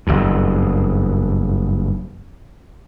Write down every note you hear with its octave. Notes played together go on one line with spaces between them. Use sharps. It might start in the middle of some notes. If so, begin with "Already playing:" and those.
F#1 E2 G2